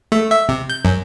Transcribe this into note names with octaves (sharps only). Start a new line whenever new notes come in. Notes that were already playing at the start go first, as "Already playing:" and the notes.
A3
E5
C3
G6
F#2